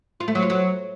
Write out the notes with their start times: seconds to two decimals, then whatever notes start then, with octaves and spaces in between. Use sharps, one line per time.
0.20 F4
0.28 A3
0.35 F#3
0.42 F4
0.50 F#3